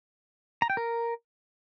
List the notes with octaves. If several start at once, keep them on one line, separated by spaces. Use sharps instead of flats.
A#5
G5
A#4